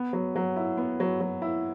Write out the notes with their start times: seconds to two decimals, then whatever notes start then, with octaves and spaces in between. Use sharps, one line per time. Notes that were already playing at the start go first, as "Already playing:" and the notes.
Already playing: B3
0.13 F#3
0.36 F#3
0.56 E4
0.77 B3
1.00 F#3
1.21 F#3
1.42 E4